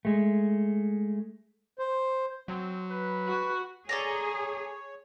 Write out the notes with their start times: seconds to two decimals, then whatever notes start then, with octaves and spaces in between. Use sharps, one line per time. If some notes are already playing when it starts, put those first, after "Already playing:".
0.05 G#3 A3
1.79 C5
2.48 F#3 C4
2.90 B4
3.28 F#4
3.89 G#4 A4 C#5 D5 A#5